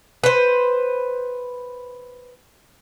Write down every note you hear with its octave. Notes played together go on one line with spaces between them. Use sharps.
B4 C5